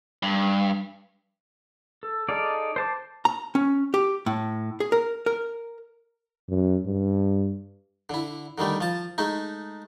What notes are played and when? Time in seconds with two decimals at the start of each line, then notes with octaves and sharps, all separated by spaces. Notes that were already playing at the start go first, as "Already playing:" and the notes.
0.23 G2
2.03 A4
2.28 D#4 G#4 A4 D5 F5
2.76 C5 A5 D6
3.25 A#5
3.55 C#4
3.94 G4
4.26 A2
4.80 G#4
4.92 A#4
5.26 A#4
6.49 F#2
6.86 G2
8.10 D3 E4
8.58 D3 D#3 G3 A3
8.81 F3 A5
9.18 G#3 A3 D#4